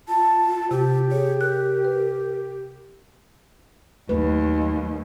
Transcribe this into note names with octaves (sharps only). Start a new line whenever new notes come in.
F4 A5
C3 F4 G4
G#4 C#5
A#4 F#6
B4
D#2 F#3 A3 B4